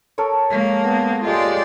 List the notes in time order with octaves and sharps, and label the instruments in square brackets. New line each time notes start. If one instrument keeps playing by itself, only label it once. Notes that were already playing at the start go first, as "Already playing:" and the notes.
[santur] A4 A#4 C#5
[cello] G#3 A#3
[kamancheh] B3
[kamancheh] G#3 G4 [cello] F4 D5